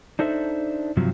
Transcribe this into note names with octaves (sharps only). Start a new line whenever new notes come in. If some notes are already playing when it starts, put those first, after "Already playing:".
D4 D#4 A4 C5 E5
G2 C3 F3 F#3